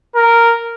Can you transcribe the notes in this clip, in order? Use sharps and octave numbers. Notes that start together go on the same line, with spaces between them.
A#4